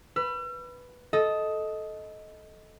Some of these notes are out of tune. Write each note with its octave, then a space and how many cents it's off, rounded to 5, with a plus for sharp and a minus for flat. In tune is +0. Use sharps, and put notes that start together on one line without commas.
B4 +0 E6 +45
A4 -10 D#5 +10